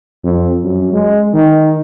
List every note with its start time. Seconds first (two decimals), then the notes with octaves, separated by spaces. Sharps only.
0.24 F2
0.64 F#2
0.93 G#3
1.34 D#3